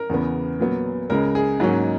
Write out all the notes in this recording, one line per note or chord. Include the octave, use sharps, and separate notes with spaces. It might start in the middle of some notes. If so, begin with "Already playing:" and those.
Already playing: A#4
E2 C#3 E3 B3
A#2 F#3 B3
C#2 C#3 G#3 A#4
G#4
G#2 F#3 A#3 C#4